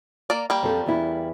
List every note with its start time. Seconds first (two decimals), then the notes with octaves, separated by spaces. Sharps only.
0.30 A#3 A#4 D5
0.50 G3 A#3 G5
0.63 F2 F3 A4
0.86 E2 E4